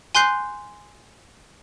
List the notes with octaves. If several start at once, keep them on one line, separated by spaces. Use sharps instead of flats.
G#5 C6 F#6 G6 C7